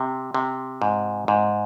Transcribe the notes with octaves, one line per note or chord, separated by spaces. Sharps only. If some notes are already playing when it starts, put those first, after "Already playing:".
Already playing: C3
C3
G#2
G#2